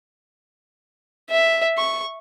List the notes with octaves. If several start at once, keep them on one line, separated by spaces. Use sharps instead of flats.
E5
C#6